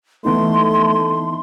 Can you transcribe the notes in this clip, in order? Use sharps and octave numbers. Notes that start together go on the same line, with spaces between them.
E3 A3 B3 D#4 C6